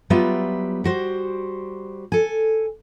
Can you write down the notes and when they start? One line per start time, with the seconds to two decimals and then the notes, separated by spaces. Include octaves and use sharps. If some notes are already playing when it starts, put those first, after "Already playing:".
0.10 F#3 G3 B3 F4 B4 E5
0.84 G3 F#4 C5
2.12 A4 G#5